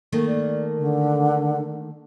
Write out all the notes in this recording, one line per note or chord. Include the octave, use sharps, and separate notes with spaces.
D#3 A3 A#3
D5
D3